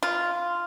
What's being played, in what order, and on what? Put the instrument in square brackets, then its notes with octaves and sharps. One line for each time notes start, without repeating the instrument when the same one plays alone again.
[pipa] F4